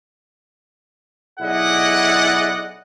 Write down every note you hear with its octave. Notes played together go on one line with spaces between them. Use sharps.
B1 E4 G#4 D5 D#5 F#5